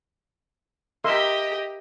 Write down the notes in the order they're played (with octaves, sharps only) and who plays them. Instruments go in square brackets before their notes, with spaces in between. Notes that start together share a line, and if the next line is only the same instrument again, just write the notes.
[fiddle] G4 D#5 [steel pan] A#4 E5 C6